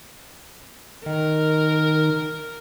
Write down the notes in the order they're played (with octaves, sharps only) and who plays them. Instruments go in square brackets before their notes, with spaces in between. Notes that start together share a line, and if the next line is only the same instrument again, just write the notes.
[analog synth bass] D#3 [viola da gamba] A#4